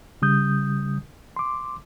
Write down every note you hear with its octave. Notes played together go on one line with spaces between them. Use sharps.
C#3 G3 D#6 G6
C6 D6